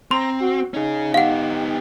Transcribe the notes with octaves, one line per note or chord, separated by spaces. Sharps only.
C4 A#5 C6
F#4
C#4 D#4 G#4
B3 G4 F5 F#5